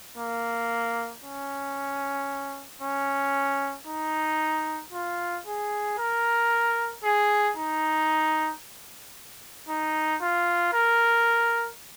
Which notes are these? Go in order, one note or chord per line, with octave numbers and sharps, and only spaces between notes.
A#3
C#4
C#4
D#4
F4
G#4
A#4
G#4
D#4
D#4
F4
A#4